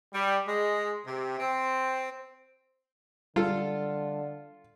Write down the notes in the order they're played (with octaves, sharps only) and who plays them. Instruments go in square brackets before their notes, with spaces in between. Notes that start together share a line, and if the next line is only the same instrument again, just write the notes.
[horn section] G3
G#3
C3
C4
[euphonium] D3 [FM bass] G3 [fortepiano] F4 A4